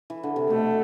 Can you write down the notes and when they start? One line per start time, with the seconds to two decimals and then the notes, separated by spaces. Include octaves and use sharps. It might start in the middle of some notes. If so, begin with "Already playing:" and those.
0.10 E3
0.23 D3
0.36 C3
0.50 B2 A3